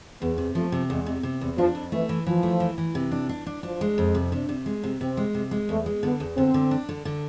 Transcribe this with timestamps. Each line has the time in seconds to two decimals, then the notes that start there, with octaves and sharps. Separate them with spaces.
0.21 E2 B3
0.38 C3
0.55 F3 A3
0.72 C3
0.90 E2 G#3
1.06 C3
1.23 C3
1.41 E2
1.58 F3 D4
1.75 F2
1.92 E3 A3
2.09 E3
2.27 E3 F3
2.43 A3
2.60 E3
2.78 E3
2.95 C3
3.12 D4
3.29 D4
3.47 D4
3.63 F3 D4
3.81 G#3
3.98 F2
4.15 C3
4.31 C3 D4
4.49 C3
4.66 G#3
4.83 C3
5.01 C3 C4
5.17 G#3
5.34 C3
5.51 G#3
5.69 E2 A3
5.86 G#3
6.03 D3 B3
6.20 E2
6.37 D3 C4
6.54 D3
6.71 D4
6.89 D3
7.05 D3